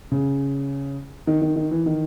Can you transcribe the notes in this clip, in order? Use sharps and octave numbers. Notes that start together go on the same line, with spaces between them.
C#3
D#3
D#3
D#3
E3
D#3